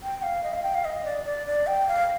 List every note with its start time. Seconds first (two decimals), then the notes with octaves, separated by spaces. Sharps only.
0.03 G5
0.23 F5
0.44 D#5
0.53 F5
0.63 G5
0.74 F5
0.85 D#5
1.05 D5
1.25 D5
1.47 D5
1.67 G5
1.88 F5